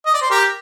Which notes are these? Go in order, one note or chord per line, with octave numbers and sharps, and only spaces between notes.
D#5
D5
C5
G4 A#4